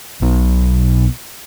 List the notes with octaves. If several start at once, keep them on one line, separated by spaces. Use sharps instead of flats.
B1 B2